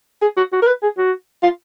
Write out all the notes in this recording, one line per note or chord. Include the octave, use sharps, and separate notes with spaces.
G#4
F#4
F#4
A#4
B4
G#4
F#4
F4